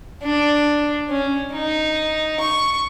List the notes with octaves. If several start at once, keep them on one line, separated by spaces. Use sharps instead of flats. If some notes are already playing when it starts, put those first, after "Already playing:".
D4
C#4
D#4
C#6